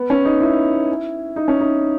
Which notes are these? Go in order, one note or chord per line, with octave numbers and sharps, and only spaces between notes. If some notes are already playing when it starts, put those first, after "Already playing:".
Already playing: B3
C#4
D#4
E4
D#4
C#4
D#4